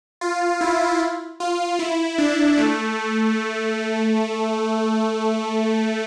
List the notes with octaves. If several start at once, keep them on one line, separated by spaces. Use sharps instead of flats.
F4
E4
F4
E4
D4
A3